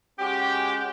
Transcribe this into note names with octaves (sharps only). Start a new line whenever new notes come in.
G#3 C#4 F#4 G4